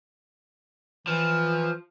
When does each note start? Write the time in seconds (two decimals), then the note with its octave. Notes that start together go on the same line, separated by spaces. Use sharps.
1.07 E3 F3